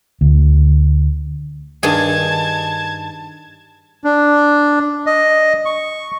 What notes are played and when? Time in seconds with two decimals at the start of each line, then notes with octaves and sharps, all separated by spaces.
0.21 D2
1.83 G2 D#3 G#4 A5 G#6
4.04 D4
5.06 D#5
5.65 C#6